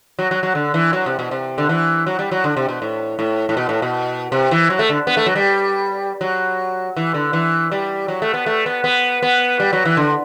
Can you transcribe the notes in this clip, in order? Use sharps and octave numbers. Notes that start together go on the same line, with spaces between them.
F#3
F#3
F#3
D3
E3
F#3
C3
B2
C3
D3
E3
F#3
G3
F#3
D3
C3
B2
A2
A2
A2
B2
A2
B2
C3
E3
F#3
A3
D3
B3
A3
F#3
G3
F#3
E3
D3
E3
G3
F#3
A3
B3
A3
B3
B3
B3
G3
F#3
E3
D3